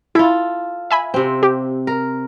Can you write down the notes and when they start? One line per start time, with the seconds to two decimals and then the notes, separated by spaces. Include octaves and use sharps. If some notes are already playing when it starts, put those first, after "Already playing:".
0.15 E4 F4 A4
0.91 E5 G#5 B5
1.14 C3 C4
1.43 G4
1.87 A#4